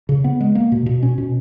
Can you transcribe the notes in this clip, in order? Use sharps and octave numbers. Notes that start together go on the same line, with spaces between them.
C#3
B3
G#3
A#3
B2
B2
C#4
B2